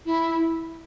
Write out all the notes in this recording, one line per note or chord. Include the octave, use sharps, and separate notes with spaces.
E4